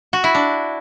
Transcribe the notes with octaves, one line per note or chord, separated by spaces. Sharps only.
F#4
E4
D4